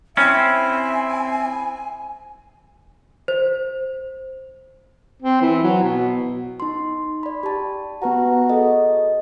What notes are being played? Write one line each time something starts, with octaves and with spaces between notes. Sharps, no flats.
C4 C#4 E4 E5 G#5
C5
C4
E3
F#3
B2
D#4 C6
D5 B5
G4 A5
B3 F#4 B4 A#5
G#4 A4 D#5